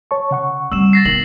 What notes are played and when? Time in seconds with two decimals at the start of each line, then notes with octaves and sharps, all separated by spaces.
0.11 C#5 A5 C#6
0.31 C#3 F#5 C#6
0.72 G3 C4 E6 E7
0.93 A6 A#6 C7
1.05 D#3 B3 F#7